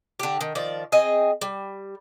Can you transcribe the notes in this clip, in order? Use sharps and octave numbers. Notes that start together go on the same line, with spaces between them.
D3 G4
D#3
D#3 F3 D5
C4 G#4 D#5
G3